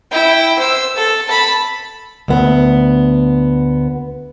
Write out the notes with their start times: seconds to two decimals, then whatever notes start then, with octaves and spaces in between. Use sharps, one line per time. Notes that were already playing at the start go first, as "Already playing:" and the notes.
0.11 E4 G5
0.58 C5 E6
0.95 A4
1.27 A5 B5
2.28 D2 B3